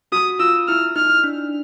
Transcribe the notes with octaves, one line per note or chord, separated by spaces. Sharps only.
F#4 D#6
F4 E6
E4 F6
D#4 F6
D4